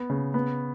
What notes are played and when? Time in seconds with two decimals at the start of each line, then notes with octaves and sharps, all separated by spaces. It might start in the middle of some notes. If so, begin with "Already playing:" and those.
Already playing: B3
0.10 C#3
0.34 B3